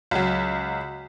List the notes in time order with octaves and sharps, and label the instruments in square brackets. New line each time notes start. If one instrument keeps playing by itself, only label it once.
[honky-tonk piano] C#2 F#3